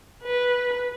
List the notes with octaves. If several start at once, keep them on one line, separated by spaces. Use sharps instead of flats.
B4